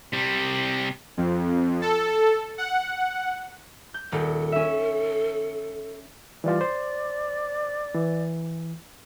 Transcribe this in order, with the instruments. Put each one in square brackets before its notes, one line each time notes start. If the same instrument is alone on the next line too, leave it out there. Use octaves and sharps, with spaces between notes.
[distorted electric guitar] C3 G3
[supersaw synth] F2
A4
F#5
[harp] G6
[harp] D#1 [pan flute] A4
[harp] C#4 E5
[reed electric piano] E3 G3 F4 [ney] D5
[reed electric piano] C5
E3